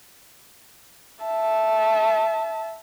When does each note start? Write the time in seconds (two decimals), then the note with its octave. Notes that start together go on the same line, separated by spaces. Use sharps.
1.24 E5 A5